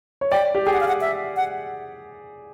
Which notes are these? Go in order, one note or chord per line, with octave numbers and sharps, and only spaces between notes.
C#5
D5 G5
G4
G#4 G5
F#5
F5
F#5
E5
F#5